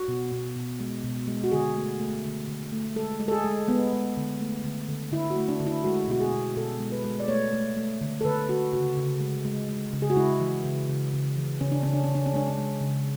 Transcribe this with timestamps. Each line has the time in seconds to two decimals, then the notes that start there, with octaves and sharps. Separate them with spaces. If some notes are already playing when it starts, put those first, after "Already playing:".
Already playing: F#4
0.08 B2
0.32 B2
0.56 B2
0.80 G#3
1.04 B2
1.28 G#3
1.44 F#4
1.52 D3 G#4
1.76 A3
2.00 A3
2.24 D3
2.48 D3
2.72 A3
2.96 G#3 A4
3.20 G#3
3.28 A4
3.32 G#4
3.44 G#3
3.68 G#3 B3
3.93 G#3
4.17 D3
4.41 A3
4.64 D3
4.89 D3
5.12 D3 E4
5.30 F#4
5.36 A3
5.48 D4
5.60 D3
5.67 E4
5.84 G#3 F#4
6.08 B2 F#4
6.20 G#4
6.32 B2
6.56 B2 A4
6.80 G#3
6.92 B4
7.04 G#3
7.20 D5
7.28 A3 C#5
7.53 A3
7.77 A3
8.01 D3
8.21 A4
8.25 D3 B4
8.49 D3 F#4
8.73 C#3 F#4
8.97 C#3
9.20 G#3
9.45 G#3
9.69 G#3
9.93 C#3
10.02 G#4
10.10 F#4
10.16 G#3 E4
10.40 E3
10.65 C#3
10.89 C#3
11.13 C#3
11.37 E3
11.61 C#3 C#4
11.72 D4
11.83 C#3 C#4
11.93 D4
12.04 C#4
12.09 C#3
12.15 D4
12.26 C#4
12.33 G#3 D4
12.48 C#4
12.58 G#3
12.81 C#3